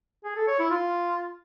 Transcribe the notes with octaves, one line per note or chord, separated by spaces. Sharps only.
G#4
A4
C#5
E4
F4